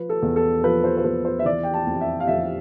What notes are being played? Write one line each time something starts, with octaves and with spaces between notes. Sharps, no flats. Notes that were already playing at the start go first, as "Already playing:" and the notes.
Already playing: F3 B4
A4
E2
A4
F3 B4
C5
C5
E2 B4
C5
E5
E3 D5
G5
A5
F2
E5
F5
F2 E5